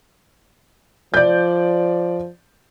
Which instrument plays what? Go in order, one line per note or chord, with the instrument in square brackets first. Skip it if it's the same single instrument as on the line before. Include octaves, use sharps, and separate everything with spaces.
[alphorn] F3 [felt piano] D5 G6